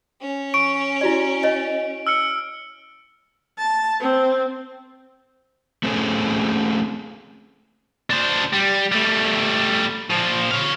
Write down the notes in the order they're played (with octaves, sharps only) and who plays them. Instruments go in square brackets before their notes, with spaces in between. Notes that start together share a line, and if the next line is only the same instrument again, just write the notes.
[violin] C#4
[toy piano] C#6 [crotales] D7
[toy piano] E4 F#4 D5
C#5 D#5
[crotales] E6 F6 C#7
[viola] A5
C4
[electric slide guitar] A3 C4 C#4 G#4 A4
[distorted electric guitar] D4 C5
G3
G3 A3
A#2 F3
C#5 F5